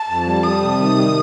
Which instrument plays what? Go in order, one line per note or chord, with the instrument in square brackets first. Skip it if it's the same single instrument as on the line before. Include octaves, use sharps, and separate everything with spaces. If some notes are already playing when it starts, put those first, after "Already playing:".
Already playing: [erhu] A5
[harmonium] F2
G3
[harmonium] G3 [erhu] D#6
[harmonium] C3
D#3
G3